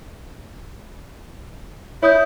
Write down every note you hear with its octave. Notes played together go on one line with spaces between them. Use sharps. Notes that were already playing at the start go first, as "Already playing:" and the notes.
E4 C#5 D#6 G6